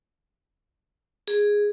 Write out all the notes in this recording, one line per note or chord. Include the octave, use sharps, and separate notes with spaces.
G#4